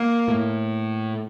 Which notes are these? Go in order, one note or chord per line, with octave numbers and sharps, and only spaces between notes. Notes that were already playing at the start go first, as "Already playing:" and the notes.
Already playing: A#3
A2